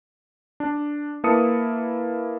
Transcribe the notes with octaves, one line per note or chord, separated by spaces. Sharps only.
D4
A#3 E4 B4 A5 D#6 C#7